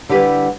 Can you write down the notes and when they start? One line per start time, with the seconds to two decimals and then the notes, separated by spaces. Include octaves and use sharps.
0.09 D3 G3 E4 G4 B4